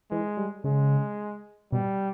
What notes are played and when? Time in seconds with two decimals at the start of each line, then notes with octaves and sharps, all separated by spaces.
0.11 E3 G#3
0.37 G3
0.64 C#3 G#3
1.72 B2 G3